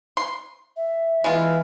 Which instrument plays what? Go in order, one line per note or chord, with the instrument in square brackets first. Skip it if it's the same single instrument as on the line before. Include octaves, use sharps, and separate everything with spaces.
[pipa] C6
[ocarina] E5
[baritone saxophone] E3 [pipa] G#3 B3 F4